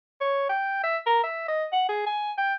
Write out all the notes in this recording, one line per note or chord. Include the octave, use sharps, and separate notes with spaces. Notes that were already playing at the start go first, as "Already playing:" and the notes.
C#5
G5
E5
A#4
E5
D#5
F#5
G#4
G#5
G5